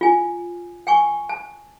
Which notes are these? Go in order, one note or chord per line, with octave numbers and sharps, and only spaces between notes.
F4 G#5
G5 G#5 C#6
A5